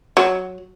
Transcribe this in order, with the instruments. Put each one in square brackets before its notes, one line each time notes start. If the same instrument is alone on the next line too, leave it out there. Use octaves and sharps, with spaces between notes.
[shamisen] F#3